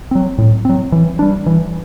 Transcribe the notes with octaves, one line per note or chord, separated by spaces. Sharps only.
F#3 C4
A2
F#3 C4
E3
G3 D4
E3